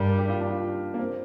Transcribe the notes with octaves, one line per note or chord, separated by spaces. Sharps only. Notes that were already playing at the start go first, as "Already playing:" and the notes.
Already playing: G2 G3 D4 A#4
G4
F4
D4
F4
A#3
C4